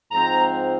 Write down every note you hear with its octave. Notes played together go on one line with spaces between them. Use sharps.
G#2 F3 C4 A#5